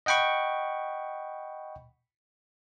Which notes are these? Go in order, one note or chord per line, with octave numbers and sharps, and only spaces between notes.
D#5 F#5 G5 B5 C#6